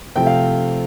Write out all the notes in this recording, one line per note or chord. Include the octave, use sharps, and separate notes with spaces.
C3 F3 A3 G5
F5